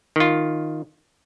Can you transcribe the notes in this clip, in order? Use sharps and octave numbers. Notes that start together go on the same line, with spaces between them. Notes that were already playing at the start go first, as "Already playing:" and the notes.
D#3 F4